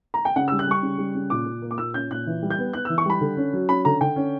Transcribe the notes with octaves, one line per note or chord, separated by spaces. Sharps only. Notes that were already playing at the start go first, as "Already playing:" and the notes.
A#5
G5
C#3 F#5
E6
G3
F#6
G3 C#6
C#3
G3
C#3
A#2 D6
A#2
A#3
D6
A#2 E6
C#4 G6
A#2 F#6
E3
G3
G6
B3
B3 F#6
E6
E3
C#6
G3 B5
D3
C#4
F#3
C#4 B5
D3 A#5
D3 G5
C#4